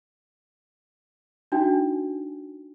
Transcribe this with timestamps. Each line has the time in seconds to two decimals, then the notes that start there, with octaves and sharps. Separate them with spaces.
1.52 D4 D#4 F#4 G5 G#5